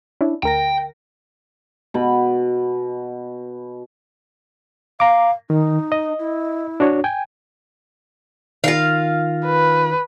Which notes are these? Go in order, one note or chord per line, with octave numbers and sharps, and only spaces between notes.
C#4 D4 E4
D2 A#4 G5 A#6
B2 B5
F5 A#5 D6
D#3 D#4
D#5
E4
D4 F#4 C#5
G5 G#5
D#3 F4 F5 F6 A#6
B4